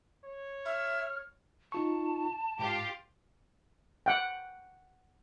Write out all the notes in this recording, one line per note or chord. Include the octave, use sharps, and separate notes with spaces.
C#5
E5 F6
D#4 F4 A5 C#6
G#2 F4 G4
F#5 G5